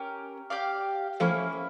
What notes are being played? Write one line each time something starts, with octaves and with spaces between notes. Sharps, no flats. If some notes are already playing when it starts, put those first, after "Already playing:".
Already playing: C#4 G4 A#4
G4 D5 F5
F3 A3 A#3 C#4 E4